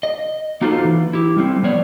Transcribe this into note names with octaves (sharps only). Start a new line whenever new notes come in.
D#5
A#3 D#4 F4 F#4 A4 C5
E3
E4 G4
G3 A3 C4
F3 B3 C#5 D5